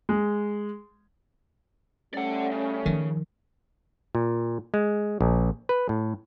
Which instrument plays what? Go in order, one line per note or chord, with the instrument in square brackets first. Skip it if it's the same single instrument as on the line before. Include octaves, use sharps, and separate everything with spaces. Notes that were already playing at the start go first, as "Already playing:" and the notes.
[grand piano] G#3
[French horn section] G3 A3 C#4 [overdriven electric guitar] D5 F#5
[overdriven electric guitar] C#3
[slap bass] D#3 [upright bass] F3
[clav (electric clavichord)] A#2
G#3
A#1
B4
A2